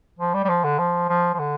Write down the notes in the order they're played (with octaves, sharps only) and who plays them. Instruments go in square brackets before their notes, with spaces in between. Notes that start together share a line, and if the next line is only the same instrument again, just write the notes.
[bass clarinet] F3
G3
G3
F3
D3
F3
F3
F3
D3